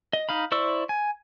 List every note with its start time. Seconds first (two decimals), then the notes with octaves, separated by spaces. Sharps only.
0.13 D#5
0.29 D#4 F5 B5
0.52 E4 C5 D5 C#6 E6
0.89 G#5